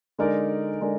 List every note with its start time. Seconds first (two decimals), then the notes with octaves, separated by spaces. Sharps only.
0.18 D3 G#3 D#4 A#4 D5
0.81 D3 G#3 D#4 A#4 D5